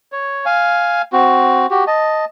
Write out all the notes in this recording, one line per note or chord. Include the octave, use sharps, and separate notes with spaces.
C#5
F5 G#5
C4 F#4
F#4 G4
D#5 A5